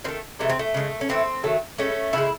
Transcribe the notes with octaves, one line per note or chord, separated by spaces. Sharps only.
D#3 A3 C4
C3 E3 G#3 A3
C4
A3
C#3 G#3
C#4
A2 E3 A3 C4
D#3 F#3 A3
A2 G#3 A3 C#4
C#3 E3 G#3 C#4 E4